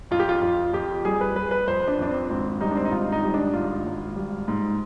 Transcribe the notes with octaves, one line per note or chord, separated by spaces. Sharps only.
F2 F4
G4
F4
F2 F4
F2 G4
G3 G#4
B4
G3 B4
B4
F2 C5
D4
F2 D4
C4
G#1 C4
G3 D#4
D4
C4
D#4
G#1 F4
D#4
G3
D4
G#1 F4
G#1
G3
G#2